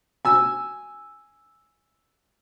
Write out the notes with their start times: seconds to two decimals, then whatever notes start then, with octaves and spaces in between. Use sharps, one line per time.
0.25 G#5 E6